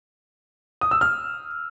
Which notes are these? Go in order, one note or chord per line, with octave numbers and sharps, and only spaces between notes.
D#6
E6
F6